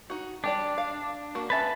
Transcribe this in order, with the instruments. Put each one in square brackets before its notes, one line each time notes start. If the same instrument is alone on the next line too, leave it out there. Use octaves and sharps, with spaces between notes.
[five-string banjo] D#4 F#4
[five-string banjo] G3 G4 D5 [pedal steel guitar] D4
[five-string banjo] F5
A#3 F#4
[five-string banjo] B3 C#4 E5 [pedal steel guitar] B4 A5